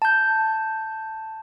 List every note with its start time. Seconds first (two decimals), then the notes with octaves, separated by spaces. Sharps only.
0.02 A5 G6